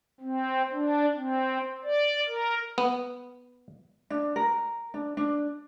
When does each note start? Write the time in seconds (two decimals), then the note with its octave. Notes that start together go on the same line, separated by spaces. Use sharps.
0.21 C4
0.73 D4
1.16 C4
1.83 D5
2.27 A#4
2.78 B3
4.10 D4
4.36 A#4
4.94 D4
5.17 D4